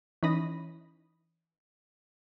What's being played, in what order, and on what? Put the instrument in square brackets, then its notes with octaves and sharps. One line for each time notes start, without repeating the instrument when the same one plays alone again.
[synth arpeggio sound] E3 C#4 D#4 B5 D#6 A#6